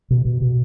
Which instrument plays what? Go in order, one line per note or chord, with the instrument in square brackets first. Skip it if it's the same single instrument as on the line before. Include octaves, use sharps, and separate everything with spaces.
[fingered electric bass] B2
B2
B2